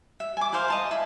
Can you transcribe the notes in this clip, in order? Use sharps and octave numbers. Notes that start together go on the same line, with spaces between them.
E5
G#5 D6
E4 A#4 C5 F5
D#5 A5 C6
E4